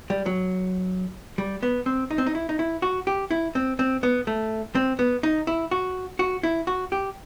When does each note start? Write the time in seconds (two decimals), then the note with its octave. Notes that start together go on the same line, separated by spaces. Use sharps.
0.10 G3
0.26 F#3
1.38 G3
1.63 B3
1.86 C4
2.11 D#4
2.18 C4
2.26 D#4
2.35 E4
2.49 D#4
2.59 E4
2.82 F#4
3.07 G4
3.31 E4
3.55 C4
3.79 C4
4.03 B3
4.27 A3
4.75 C4
4.99 B3
5.23 D#4
5.47 E4
5.71 F#4
6.19 F#4
6.43 E4
6.67 F#4
6.92 G4